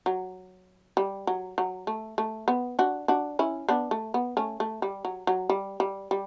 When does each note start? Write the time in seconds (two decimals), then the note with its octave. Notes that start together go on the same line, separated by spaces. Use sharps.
0.06 F#3
0.97 G3
1.27 F#3
1.58 F#3
1.87 A3
2.18 A3
2.48 B3
2.79 D4 F#4
3.08 D4 F#4
3.39 C#4 E4
3.69 B3 D4
3.91 A3
4.14 B3
4.37 A3 C#4
4.60 A3
4.82 G3
5.05 F#3
5.27 F#3
5.50 G3
5.80 G3
6.11 G3